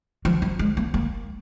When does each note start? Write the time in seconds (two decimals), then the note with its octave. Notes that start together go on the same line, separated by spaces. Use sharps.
0.25 F3
0.42 F#3
0.59 G#3
0.77 A#3
0.94 A#3